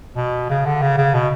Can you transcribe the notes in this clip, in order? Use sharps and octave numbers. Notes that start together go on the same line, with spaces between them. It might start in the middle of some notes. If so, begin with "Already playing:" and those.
B2
C#3
D3
C#3
C#3
B2